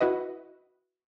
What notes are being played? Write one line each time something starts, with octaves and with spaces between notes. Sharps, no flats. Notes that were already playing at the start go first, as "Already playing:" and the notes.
E4 F#4 B4 D#5